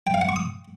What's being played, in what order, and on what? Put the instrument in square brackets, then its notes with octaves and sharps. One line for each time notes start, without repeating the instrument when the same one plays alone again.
[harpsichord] G5
F5
F#5
C#6
D#6